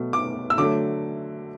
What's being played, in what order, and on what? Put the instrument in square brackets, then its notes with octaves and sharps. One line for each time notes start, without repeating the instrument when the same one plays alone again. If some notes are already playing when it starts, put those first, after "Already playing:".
Already playing: [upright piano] B2 F#3 A3
D6
E6
D3 F#3 A3 D6